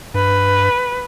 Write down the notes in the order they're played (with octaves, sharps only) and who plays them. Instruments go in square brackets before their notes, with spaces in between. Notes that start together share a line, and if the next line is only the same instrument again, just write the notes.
[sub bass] G2 [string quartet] B4